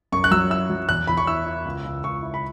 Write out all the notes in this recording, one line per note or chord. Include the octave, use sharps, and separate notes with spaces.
F#2 C#6
F#6
F#3 E6
E4 E6
F#3
E2 F#6
E2 B5
C#6
E4 E6
E4
C#2
C#2
C#2 C#6
E4
B5